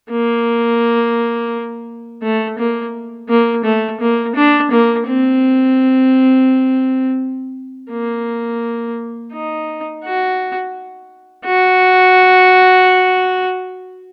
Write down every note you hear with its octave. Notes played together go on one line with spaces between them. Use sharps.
A#3
A3
A#3
A#3
A3
A#3
D4
A#3
C4
A#3
D#4
F#4
F#4